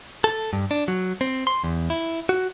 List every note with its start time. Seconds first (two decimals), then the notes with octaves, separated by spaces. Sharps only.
0.24 A4
0.53 G2
0.71 D4
0.88 F#3
1.21 C4
1.47 C6
1.64 E2
1.90 E4
2.29 F#4